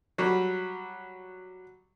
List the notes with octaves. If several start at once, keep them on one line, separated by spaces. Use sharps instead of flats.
F#3 G3